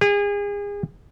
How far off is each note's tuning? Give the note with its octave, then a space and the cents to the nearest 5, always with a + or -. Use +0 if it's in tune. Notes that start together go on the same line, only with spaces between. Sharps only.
G#4 -35